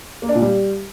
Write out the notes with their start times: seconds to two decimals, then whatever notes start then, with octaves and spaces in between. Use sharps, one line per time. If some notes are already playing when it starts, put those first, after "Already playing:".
0.22 A#3
0.29 D4
0.35 A#2
0.42 G3